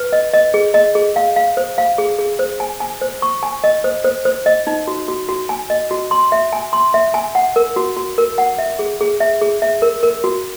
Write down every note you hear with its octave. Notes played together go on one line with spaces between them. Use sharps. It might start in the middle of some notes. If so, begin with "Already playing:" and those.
Already playing: B4
D#5
D#5
G#4
D#5
G#4
F5
F5
C5
F5
G#4
G#4
C5
G#5
G#5
C5
C#6
G#5
D#5
C5
C5
C5
D#5
D#4
F#4
F#4
F#4
G#5
D#5
F#4
C6
E5
G#5
C6
E5
G#5
F#5
A#4
F#4
F#4
A#4
F#5
E5
G#4
G#4
E5
G#4
E5
A#4
A#4
F#4